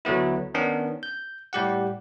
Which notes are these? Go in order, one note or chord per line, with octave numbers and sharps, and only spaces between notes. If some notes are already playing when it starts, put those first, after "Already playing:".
D2 F#3 A3 B3 E4
D#3 B3 C#4 D4
G6
A2 G3 G4 F#5